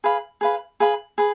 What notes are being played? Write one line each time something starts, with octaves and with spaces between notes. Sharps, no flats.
G#4 B4 F5 B5
G#4 B4 F5 B5
G#4 B4 F5 B5
G#4 B4